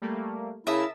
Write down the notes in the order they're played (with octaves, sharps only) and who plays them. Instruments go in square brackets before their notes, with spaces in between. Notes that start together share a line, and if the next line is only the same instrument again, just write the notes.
[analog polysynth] G3 A3 A#3
[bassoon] C#3 [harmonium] E4 [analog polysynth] A#4 A5 E6 [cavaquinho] E5 D#6